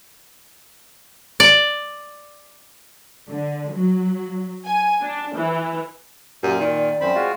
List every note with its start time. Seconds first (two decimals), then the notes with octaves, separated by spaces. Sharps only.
1.40 D5
3.30 D3
3.72 F#3
4.65 G#5
5.02 D4
5.35 E3
6.43 F#2 A#2 G4
6.60 D#3 D5
7.01 F#2 C4 B5
7.15 G#3 F4 F#4